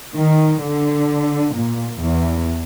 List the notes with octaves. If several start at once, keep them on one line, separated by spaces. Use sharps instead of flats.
D#3
D3
A#2
E2